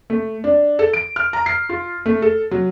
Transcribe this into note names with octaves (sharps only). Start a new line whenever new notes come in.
A3
D4
A4
D7
F6
A#5
C7
F4
A3
A4
F#3